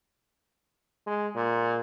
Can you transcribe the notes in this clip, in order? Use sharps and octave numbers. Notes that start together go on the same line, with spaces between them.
G#3
A#2